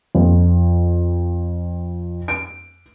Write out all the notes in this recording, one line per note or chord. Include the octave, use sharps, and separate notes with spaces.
F2
D7